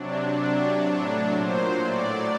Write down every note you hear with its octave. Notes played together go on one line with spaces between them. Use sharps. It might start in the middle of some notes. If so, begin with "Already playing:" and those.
Already playing: C3 F#3 D4
C3 F#3 D4
A2 F#3
A#2 F#3 C5
A2 F#3 D5